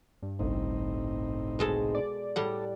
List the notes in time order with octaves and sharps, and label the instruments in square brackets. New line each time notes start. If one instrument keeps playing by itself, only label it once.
[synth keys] G2
[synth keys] G1 C2 [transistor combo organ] A2 C4 D#4
[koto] B2 G#3 A4
[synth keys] D5
[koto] A2 G3 F#5 [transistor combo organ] A4